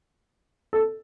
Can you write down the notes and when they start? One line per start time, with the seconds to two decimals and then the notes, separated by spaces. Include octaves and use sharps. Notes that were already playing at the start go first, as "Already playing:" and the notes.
0.73 A4